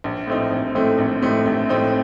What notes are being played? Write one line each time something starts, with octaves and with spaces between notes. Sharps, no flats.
A#1
A2 A3 C4 D#4
A#1
A2 A3 C4 D#4
A#1
A2 A3 C4 D#4
A#1
A2 A3 C4 D#4